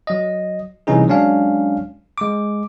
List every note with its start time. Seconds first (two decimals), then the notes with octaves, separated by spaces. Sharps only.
0.07 F#3 D#5
0.87 C3 E3 G3 C#4 D#4 G#4
1.08 F#3 G#3 C#4 D4 F5
2.18 G#3 D6